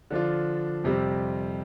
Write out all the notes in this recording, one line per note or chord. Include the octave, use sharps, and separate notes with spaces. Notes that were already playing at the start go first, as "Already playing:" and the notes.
D3 F3 D4 F4
F2 C3 G3 C4